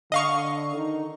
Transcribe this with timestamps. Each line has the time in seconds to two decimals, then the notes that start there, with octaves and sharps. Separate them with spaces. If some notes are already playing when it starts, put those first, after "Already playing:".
0.12 D3 D#5 F5 C#6
0.75 D#3 D#4